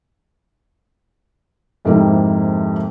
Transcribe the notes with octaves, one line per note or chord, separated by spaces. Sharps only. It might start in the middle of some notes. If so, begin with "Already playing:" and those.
F2 G#2 C3 A#3 C4 E4